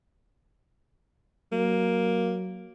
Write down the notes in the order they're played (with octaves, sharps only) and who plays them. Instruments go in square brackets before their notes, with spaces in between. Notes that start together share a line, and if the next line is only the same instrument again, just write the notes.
[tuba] F#3 [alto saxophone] A#3